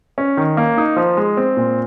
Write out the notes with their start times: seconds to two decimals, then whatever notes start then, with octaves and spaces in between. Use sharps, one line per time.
0.18 C#4
0.37 D#3
0.57 A#3
0.78 D#4
0.96 F3
1.17 G#3
1.37 C4
1.57 A#2